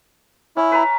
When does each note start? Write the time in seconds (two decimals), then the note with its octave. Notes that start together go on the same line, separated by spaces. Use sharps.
0.57 C#4 E4
0.72 B4 A#5